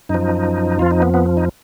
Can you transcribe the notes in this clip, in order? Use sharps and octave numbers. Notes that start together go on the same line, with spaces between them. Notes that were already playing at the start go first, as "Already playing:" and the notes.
F#2 F3 D#4
F2 F3 F4
D#4
B3
B3
D#4